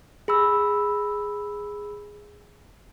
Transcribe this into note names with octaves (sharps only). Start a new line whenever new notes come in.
G#4 B5 E6